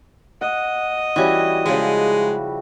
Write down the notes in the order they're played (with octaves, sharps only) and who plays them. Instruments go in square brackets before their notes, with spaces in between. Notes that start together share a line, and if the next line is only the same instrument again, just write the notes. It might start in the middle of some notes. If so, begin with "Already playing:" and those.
[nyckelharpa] D#5 [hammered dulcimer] F#5
[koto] E3 C#4 [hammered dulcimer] G3 E4 F#4
[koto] C#3 F3 [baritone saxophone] G#3